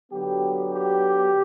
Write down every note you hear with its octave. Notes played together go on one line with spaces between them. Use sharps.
D3 F#3 B3 G4
G4